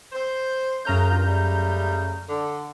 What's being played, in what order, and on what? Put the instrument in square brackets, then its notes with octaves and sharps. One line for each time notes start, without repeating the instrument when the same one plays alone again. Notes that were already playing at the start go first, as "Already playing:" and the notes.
[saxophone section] C5
[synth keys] F#2 A#5 G6 [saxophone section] C#3 A3 C#4
[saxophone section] G2 A#2 F4
C#3 G3 A3
D3